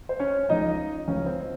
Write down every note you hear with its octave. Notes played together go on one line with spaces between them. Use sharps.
C5
C#4 C#5
C#2 C#3 F3 A#3 D#4 D#5
C#2 C#3 F3 A#3 C#4 C#5
C4 C5